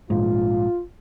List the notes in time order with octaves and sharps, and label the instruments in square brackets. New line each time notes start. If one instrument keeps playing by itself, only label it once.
[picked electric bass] A#1 G#2 [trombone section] F4